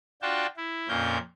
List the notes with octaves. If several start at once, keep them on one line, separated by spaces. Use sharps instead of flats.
D4 F4 F#4 G5 A5
E4
F2 A#2 C#4 A#4 G6